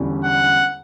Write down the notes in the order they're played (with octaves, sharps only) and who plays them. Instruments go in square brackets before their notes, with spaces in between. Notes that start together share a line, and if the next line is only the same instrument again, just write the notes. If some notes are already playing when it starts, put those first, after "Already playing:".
Already playing: [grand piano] E1 E2 D3 G3 C#4
[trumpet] F#5